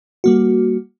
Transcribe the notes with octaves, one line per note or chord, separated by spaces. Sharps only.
G3 A#3 F#4